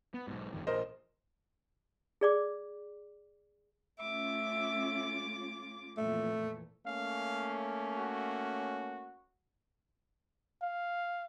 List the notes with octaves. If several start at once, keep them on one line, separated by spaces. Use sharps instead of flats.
B3
B1 G#2
G1 F2 D#3
A#1 A#4 C5 D#5
G#4 D5 D6
A3 C#4 F4 E5 D6
F2 A#2 E3 A3
A3 A#3 C#4 F5
F#4
F5